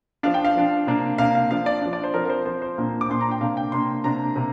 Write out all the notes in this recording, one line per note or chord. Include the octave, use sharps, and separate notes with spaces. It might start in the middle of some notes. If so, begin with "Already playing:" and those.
F3 D4 F5
G5
F5
F3 D4
C3 A#3 D4
C3 A#3 D4 F5
F5
F3 D4 F5
D5
F3 D4
D5
C5
F3 C4 A#4
A#4
C5
F3 C4 C5
C5
A#2 A#3 D4
D6
A#2 A#3 D4 C6
A#5
G5
C3 A#3 D4 F5
G5
C3 A#3 D4 C6
C3 A#3 D4 A#5
C3 A#3